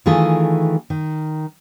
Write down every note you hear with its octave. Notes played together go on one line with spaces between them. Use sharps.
D#3 E3 A3 F4 G#4 A4
D#3